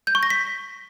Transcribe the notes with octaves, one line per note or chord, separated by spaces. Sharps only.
G6
C#6
A#6
B6